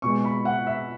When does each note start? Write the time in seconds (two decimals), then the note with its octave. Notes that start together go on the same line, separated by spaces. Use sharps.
0.02 B2 G#3 C#6
0.24 B5
0.45 F#5
0.67 E5